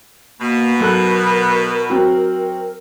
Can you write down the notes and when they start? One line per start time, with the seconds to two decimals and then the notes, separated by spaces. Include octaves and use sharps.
0.40 B2 A#3
0.80 B1 A4 A#4 F#6
1.90 F#3 C4 F#4